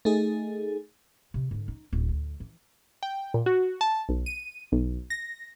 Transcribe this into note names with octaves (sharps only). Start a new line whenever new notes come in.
A3 D#4 G#4
C3
G#2 D3
D#4
D1 E4
D2
E3
G5
A#2
F#4
A5
B1
D#7
B1
A#6